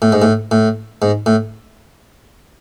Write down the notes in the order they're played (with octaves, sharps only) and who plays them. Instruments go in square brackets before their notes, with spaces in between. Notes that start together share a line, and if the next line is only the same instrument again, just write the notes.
[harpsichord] A2
G#2
A2
A2
G#2
A2